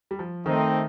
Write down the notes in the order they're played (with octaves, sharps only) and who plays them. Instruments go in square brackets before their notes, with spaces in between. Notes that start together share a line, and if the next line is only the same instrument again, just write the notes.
[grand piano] G3
F3
[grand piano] D#3 [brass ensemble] A3 C4 D#4